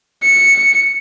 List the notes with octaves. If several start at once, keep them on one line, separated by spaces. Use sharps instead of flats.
C#7